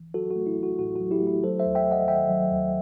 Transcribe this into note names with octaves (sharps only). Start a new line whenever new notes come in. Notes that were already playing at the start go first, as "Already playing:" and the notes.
Already playing: G1 E3
F#3 F#4 A4
F#4
A3
E4
A1
F#4
A2 F#4
F#3 F#4
E4 G4
A3 E4
F#3 A4 C5
C5 E5
D#2
E5 G5
D#2
D#5 F#5
D#3 E5 G5
F#3
D#2